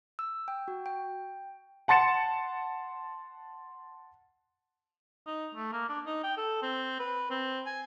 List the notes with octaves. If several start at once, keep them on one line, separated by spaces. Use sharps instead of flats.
E6
G5
F#4
G5
F#5 A5 C6 A6 C#7 E7
D#4
A3
A#3
D4
D#4
G5
A4
C4
B4
C4
G#5